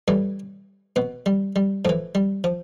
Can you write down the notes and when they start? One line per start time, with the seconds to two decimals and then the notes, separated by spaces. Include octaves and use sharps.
0.08 A2 E3 G3
0.96 B2 B3
1.26 G3
1.56 G3
1.85 A2 E3 F3
2.15 G3
2.44 F3